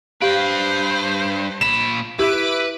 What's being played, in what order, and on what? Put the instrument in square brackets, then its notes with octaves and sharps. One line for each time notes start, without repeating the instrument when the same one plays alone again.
[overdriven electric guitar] G2 B4 [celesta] G4 F5 D7 [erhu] C5
[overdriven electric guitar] A#2 B5 [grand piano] E7
[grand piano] E4 [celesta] G4 G6 [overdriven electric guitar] B4 [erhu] D6